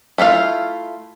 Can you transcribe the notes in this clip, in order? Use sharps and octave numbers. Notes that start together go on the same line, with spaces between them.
A3 E4 F4 F5